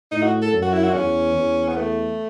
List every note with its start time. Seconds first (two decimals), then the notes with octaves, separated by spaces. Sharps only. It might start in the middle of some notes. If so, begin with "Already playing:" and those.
0.11 A2 D#4
0.22 F#4
0.42 A4
0.53 F#2
0.63 F#4
0.73 E4
0.84 F#4
0.93 E2 C#4
1.34 E2
1.68 B3
1.76 A3